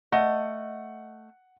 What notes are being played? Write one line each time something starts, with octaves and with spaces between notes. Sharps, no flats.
A3 D#5 F#5